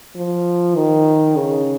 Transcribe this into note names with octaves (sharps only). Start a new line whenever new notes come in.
F3
D#3
C#3